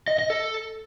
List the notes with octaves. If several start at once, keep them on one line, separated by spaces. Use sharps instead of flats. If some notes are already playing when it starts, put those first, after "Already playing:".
D#5
D#5
A4